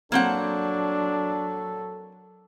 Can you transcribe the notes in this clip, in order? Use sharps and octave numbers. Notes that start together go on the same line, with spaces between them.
F#3 A#3 C4 D4 A4 F#5